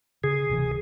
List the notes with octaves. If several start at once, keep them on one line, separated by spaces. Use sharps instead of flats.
C#3 G#4
D1 C3 E3